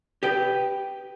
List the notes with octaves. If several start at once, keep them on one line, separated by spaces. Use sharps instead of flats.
G4 B4 G5